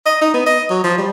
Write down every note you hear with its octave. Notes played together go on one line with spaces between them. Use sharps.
D#5
D#4
B3
D#5
F#3
F3
G3